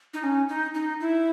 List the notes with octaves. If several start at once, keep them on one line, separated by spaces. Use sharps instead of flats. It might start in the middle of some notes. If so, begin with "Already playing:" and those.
D#4
C#4
D#4
D#4
E4